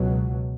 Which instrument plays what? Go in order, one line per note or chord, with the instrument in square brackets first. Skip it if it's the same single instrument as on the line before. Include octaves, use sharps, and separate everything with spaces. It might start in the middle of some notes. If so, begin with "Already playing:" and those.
Already playing: [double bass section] C#2 B2 F#3